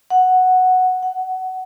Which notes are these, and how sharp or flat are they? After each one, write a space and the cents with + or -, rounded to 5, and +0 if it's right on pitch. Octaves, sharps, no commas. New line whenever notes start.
F#5 +0
F#5 +15